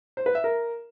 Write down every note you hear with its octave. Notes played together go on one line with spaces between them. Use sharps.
C5
B4
E5
A#4